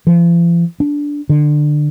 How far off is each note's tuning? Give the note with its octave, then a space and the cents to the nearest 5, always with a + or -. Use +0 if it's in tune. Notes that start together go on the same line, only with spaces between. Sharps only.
F3 -45
D4 -10
D3 +20